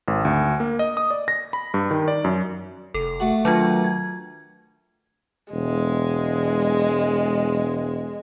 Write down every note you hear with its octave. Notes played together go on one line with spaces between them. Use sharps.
G#1
D2
A#3
D#5
D#6
D5
A#6
B5
G2
D#3
D5
F#2
F1 A4
A3 F#4
D#3 F#3 D4 F4
G#6
E1 G#3